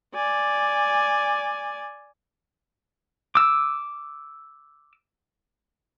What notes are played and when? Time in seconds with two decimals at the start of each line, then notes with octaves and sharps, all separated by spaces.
0.15 D5 G#5
3.35 D6 E6